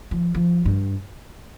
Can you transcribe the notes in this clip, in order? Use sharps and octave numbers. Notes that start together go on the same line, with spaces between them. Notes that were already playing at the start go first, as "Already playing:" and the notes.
F3
F3
G2